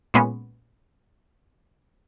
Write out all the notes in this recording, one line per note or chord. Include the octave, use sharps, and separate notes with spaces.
A#2 G#3 B3 C#4